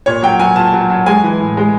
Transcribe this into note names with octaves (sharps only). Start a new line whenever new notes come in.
A#2 C#5
F#3 G5
F#3 G#5
A#2 A5
F#3
F#3
G#3 G#5
E3
A2
G#3